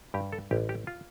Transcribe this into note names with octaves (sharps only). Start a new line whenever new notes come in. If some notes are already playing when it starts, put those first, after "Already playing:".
G2 G4
A4
A1 G4
G4
F4